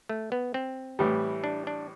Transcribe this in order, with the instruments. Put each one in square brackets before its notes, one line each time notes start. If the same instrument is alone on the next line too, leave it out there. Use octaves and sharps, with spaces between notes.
[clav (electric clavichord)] A3
B3
C4
[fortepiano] A2 E3 G3
[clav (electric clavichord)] D4
D4